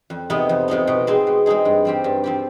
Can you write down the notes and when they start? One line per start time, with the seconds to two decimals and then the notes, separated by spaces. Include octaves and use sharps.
0.10 F2
0.30 C3 F3 B3 D#4
0.49 F2
0.68 C3 F3 B3 D#4
0.87 B2
1.07 G#3 C4 D#4 G#4
1.27 B2
1.46 G#3 C4 D#4 G#4
1.65 G2
1.85 F3 C4 G4
2.04 G2
2.24 F3 C4 G4